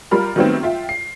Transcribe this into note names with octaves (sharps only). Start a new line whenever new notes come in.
G3 F4 A#4 B5 F6
D#3 F#3 G3 A3 B3 C4
F4 E5 G5
C7